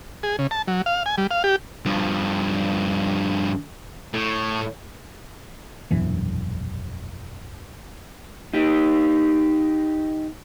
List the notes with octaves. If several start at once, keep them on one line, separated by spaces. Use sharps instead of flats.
G#4
C#3
A5
F#3
F5
G#5
G3
F5
G4
G2 F3
A2
E1 A#1 F#2 E3
D#4 G4